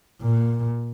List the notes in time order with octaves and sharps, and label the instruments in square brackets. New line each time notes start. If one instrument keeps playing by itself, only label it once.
[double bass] A#2